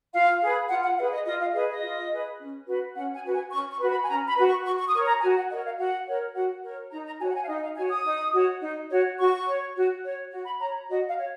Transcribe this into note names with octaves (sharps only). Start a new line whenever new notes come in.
F4 F5
G#4 B4
F4 F#5
F#5
G#4 B4 F5
D#5
F4 D#5
F5
G#4 B4 D#5
D#5
F4
G#4 B4
C#4
F#4 B4
C#4 F#5
G#5
F#4 B4
G#5
C#4 C#6
C#6
F#4 B4
B5
G#5
C#4 A#5
B5
F#4 B4
C#6
F#4 C#6
C#6
D#6
A#4 C#5 C#6
A#5
F#4 G#5
F#5
A#4 C#5 D#5
F5
F#4 F#5
A#4 C#5
F#4 F#5
A#4 C#5
D#4 A#5
A#5
F#4 C#5 G#5
F#5
G#5
F5
D#4 D#5
F5
F#4 C#5 G#5
D#6
D#4
F#4 C#5
D#4
F#4 C#5
F#4 C#6
C#5
F#4
C#5
F#4
B5
C#5 A#5
F#4 D#5
F5
C#5